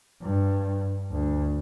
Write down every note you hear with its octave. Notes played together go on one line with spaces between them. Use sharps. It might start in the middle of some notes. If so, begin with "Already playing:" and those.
G2
D2